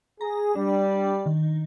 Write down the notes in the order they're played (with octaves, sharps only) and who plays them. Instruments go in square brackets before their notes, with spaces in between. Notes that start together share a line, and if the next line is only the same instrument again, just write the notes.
[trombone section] G#4 [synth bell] A#5
[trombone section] G3 [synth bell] D4
[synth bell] D#3